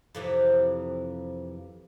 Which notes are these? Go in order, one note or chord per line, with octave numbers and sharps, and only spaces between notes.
F2 C3 E3